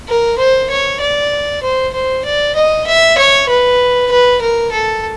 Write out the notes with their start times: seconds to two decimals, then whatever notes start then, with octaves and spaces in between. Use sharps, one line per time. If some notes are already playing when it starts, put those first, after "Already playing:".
0.08 A#4
0.39 C5
0.70 C#5
1.00 D5
1.62 C5
1.93 C5
2.25 D5
2.56 D#5
2.86 E5
3.17 C#5
3.49 B4
4.11 B4
4.41 A#4
4.72 A4